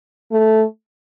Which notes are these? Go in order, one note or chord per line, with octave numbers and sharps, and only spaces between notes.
A3